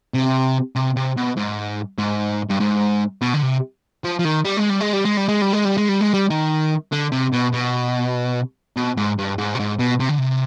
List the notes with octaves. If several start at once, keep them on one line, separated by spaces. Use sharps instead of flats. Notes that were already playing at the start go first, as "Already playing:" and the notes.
C3
C3
C3
B2
G#2
G#2
G2
G#2
B2
D3
C3
F3
F3
D#3
G3
G#3
G3
G#3
G3
G#3
G3
G#3
G3
G#3
G3
G#3
G3
G#3
G3
D#3
D3
C3
B2
B2
B2
G#2
G2
G#2
B2
G#2
B2
C3
D3
C3